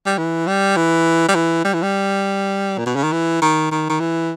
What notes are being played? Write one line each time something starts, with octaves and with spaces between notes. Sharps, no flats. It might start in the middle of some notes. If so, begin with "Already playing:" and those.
G3
E3
G3
E3
G3
E3
G3
E3
G3
A#2
B2
C#3
D#3
E3
D#3
D#3
D#3
E3